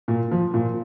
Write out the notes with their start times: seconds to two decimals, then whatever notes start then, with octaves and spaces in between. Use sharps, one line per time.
0.08 A#2
0.31 F3
0.54 A#2